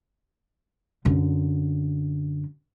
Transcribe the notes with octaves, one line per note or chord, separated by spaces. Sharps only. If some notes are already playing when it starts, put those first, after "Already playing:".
F#2 D3